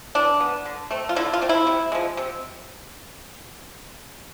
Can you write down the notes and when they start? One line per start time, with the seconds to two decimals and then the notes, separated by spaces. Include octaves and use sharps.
0.15 E3 D4
0.40 B3
0.65 D3
0.91 A3 C4
1.09 F4
1.16 D3 E4
1.33 F4
1.42 A3 C4
1.49 E4
1.67 C3
1.92 F3 G#3
2.17 C3